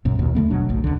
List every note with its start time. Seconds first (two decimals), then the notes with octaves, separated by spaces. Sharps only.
0.05 A#1 F#2 B2
0.19 A1 D#2 B2
0.35 D#2 D3 A3 B3
0.50 G1 B2 F#3 D4
0.68 F#1 B1 F#2 A2
0.84 C#2 D3